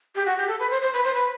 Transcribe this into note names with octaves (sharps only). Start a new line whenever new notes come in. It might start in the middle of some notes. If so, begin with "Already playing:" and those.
G4
F#4
G4
A4
B4
C5
C5
B4
C5
B4